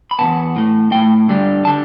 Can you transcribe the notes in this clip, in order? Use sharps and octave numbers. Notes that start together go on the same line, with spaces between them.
B5
E2 B2 B3 A5
A2 A3
A2 A3 G5
G2 D3 G3
D3 G3 A5